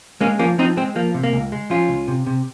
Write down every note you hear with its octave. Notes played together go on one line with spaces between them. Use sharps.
G#3 A#3 C#4
F3 A#3 C#4
F3 C4 D#4
G#3 C4
F3 A#3
C3
A#3
C#2
G#3
F3 C#4 F4
C#2
C3
C3